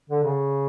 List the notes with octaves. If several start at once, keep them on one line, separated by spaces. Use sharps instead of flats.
D3
C#3